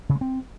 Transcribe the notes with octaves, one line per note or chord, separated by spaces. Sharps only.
C#3
G#3
C4